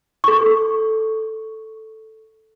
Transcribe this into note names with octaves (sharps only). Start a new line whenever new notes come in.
A4 C#6